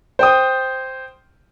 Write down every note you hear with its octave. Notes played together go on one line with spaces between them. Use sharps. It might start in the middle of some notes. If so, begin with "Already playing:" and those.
C5 G5 D#6